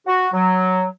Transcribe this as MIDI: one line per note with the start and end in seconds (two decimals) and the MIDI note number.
0.07 0.28 66
0.34 0.86 54